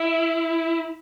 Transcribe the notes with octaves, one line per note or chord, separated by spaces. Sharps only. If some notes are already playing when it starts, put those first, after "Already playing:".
Already playing: E4